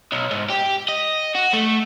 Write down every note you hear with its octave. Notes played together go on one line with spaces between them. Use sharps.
B1
G#2
G4
D#5
F#4
A3